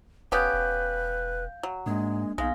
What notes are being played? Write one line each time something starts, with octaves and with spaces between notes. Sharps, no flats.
E1 B3 C#4 G4 B4 F5 G6
E1
F#3
G#2 G#3 A#3 D4
B1 G#3 B3 D#4 F5 A#6